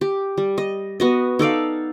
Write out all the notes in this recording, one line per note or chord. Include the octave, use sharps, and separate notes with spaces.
G4
G3
D#5
B3 F#4 D#5
D#4 A4 D5 F5